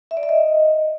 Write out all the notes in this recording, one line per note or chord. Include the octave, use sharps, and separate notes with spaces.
E5
D5
E5
D#5